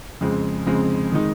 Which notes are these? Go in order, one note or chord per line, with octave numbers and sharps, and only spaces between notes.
F2 C#3 G#3 C4
F2 C#3 G#3 C4
D#3 G#3 D#4